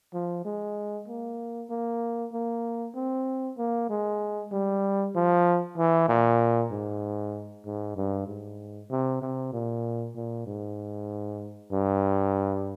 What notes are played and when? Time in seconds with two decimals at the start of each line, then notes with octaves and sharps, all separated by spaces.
0.13 F3
0.45 G#3
1.08 A#3
1.70 A#3
2.33 A#3
2.95 C4
3.57 A#3
3.89 G#3
4.52 G3
5.15 F3
5.78 E3
6.08 A#2
6.71 G#2
7.65 G#2
7.96 G2
8.27 G#2
8.90 C3
9.22 C3
9.53 A#2
10.15 A#2
10.47 G#2
11.72 G2